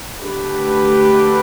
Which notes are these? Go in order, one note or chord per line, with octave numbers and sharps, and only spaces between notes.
D3 A3 D4 G4 B4